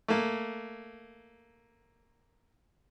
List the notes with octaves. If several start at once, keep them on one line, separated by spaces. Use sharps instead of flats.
A3 A#3